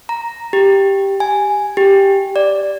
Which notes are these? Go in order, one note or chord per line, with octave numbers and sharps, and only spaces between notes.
A#5
G4
G#5
G4
D5